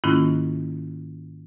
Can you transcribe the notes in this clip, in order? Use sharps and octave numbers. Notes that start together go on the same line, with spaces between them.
G#2 D#3 A#3 C#4 E4 F4